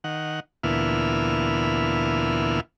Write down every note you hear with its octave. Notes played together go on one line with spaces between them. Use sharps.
D#3 F#5
D2 A#2 E3 B3 E4 F6